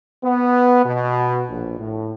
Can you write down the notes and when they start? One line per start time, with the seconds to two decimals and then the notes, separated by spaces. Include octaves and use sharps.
0.24 B3
0.84 B2
1.49 A#1
1.78 A2